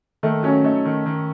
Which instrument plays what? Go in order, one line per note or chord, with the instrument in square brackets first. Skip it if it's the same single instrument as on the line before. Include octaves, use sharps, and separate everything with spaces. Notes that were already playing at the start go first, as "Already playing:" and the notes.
[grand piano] D#3 [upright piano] A3
[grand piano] F#3 [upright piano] C#4
[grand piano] A3 [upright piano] D#4
[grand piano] D#3
D#3